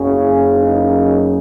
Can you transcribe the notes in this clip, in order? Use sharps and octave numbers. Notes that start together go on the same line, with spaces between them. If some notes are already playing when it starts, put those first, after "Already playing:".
Already playing: F#1 F#2 C#3 C#4
D#4